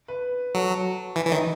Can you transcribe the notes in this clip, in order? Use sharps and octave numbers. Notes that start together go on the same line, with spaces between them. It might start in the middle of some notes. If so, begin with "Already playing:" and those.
B4
F#3 A4
E3 B4
E3 C#5
D#3
D#5